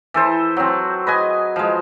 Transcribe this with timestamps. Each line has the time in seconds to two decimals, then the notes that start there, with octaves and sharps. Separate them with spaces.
0.14 E3 A4 C5
0.57 F#3 C4
1.07 B4 D#5 G#5
1.56 F3 G#3